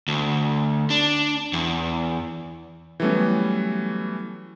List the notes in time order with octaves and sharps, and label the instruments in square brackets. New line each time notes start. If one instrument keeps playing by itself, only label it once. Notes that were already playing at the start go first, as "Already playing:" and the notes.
[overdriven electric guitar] D2
D4
E2
[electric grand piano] E3 F#3 G3 A3 B3 C#4